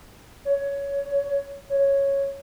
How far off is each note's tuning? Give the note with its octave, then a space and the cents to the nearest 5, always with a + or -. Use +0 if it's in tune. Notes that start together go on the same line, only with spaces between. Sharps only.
C#5 +15
C#5 -5